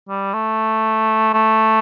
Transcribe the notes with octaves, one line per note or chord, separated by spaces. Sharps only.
G3
A3
A3